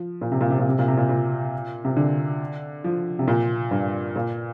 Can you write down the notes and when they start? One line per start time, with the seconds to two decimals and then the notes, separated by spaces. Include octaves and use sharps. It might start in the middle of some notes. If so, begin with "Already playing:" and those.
Already playing: F3
0.21 A#2
0.32 C3
0.41 A#2
0.51 C3
0.59 A#2
0.69 C3
0.79 A#2
0.88 C3
0.97 A#2
1.09 A#2
1.85 C3
1.97 D3
2.84 F3
3.19 C3
3.28 A#2
3.71 G2
4.16 A#2